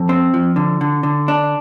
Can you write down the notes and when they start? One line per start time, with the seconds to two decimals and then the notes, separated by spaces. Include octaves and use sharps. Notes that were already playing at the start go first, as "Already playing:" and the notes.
Already playing: F2
0.09 C4
0.34 F3
0.56 D3
0.81 D3
1.03 D3
1.28 D4